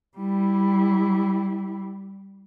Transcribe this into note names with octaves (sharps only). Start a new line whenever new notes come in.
G3 E4